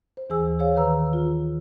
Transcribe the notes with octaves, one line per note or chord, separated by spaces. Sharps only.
C5
D#2 E3 G#4 C5 G#5 E6
G#4 C#5 F5
D#3 B4 A#5 E6
F4